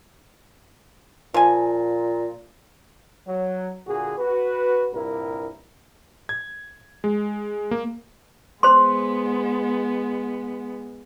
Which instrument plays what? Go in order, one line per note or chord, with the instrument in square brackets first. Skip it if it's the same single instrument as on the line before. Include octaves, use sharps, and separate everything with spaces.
[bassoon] A#2 [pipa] F3 G#5
[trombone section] F#3
A#2 D3 F#4 G#4
F#4 B4
C2 G2 A#2 E4 A#4
[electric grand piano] G#6
G#3
A#3
[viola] G#3 B3 [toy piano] C5 C6